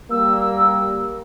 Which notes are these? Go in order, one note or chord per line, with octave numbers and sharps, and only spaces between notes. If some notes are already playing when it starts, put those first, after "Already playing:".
G3 A#3 E6